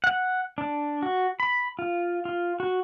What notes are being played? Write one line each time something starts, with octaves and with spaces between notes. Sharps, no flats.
F#5
D4
F#4
B5
F4
F4
F#4